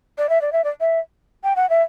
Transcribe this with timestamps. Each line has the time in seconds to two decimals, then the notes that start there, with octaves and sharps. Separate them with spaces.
0.18 D5
0.29 E5
0.41 D5
0.53 E5
0.64 D5
0.80 E5
1.44 G5
1.56 F#5
1.70 E5